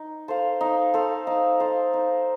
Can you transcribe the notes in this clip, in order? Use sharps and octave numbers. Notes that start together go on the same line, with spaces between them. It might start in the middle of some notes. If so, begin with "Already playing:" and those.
Already playing: D#4
A4 C5 F5
D#4
A4 C5 F5
D#4
A4 C5 F5
D#4